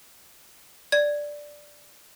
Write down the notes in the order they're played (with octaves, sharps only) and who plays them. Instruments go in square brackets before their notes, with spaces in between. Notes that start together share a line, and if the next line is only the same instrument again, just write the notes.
[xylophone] D5 G#6